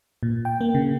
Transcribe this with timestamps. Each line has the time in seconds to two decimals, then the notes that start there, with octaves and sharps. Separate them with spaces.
0.23 A#2
0.45 G5
0.61 A#3
0.75 C#3